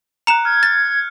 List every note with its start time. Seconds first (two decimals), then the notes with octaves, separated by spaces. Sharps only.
0.27 A#5 F#6 C#7 E7
0.45 F6 G#6
0.63 A6